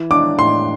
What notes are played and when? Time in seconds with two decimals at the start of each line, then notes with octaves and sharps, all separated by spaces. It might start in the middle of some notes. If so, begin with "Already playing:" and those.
Already playing: E3
0.11 D4 D6
0.38 A2 C6